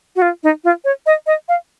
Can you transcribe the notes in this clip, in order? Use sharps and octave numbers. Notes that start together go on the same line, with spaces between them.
F#4
F4
D#4
F4
C#5
D#5
D#5
F5